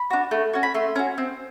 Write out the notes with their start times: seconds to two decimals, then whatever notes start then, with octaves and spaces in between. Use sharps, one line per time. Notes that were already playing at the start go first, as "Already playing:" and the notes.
Already playing: B5
0.10 D4 F#4
0.31 A3
0.53 C#4 F#4
0.63 B5
0.74 A3 C6
0.96 C#4 F#4
1.18 C4